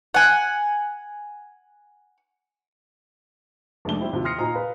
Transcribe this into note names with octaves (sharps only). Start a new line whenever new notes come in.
F#5 G#5
F1 G#3 A3 D4 G7
G3 C4 E4 G5
D#2 C3 F3
C6 D#6 F6 A#6 C7 C#7
A#2 D#4 C5 G#5 A#5 D#6
B4 F5